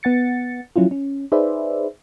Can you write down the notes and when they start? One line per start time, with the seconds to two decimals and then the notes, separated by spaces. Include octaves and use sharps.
0.03 B3 F#5 A6 C#7
0.76 F3 F#3 C#4 E4 F4
0.91 C#4
1.32 D#4 G#4 B4 C5 D5 E5